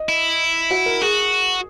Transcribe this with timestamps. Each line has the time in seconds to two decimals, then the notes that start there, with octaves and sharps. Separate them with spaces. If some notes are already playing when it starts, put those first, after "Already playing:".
Already playing: D#5
0.09 E4
0.71 F#4
0.86 A#4
1.01 F#4 G#4